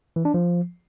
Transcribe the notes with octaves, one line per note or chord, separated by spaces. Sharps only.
E3
D4
F3